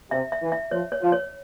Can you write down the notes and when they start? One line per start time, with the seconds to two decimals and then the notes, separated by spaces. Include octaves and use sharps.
0.11 C3 E5
0.32 E5
0.42 E3
0.52 E5
0.71 F3 C#5
0.92 C#5
1.02 F3
1.12 C#5